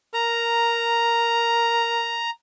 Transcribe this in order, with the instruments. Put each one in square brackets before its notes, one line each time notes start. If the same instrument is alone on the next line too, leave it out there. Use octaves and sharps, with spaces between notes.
[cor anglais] A#4 [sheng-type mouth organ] A#5